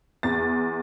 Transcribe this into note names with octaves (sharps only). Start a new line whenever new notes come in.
E2 A6